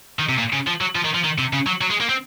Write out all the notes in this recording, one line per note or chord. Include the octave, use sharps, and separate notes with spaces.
D#3
C3
A#2
C#3
F3
F#3
F3
D#3
F3
D#3
C3
C#3
F#3
F#3
G#3
A#3
C4